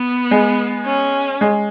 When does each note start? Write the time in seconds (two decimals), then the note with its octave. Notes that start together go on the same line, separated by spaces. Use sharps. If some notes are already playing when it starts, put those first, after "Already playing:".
Already playing: B3
0.31 G#3
0.85 C#4
1.41 G#3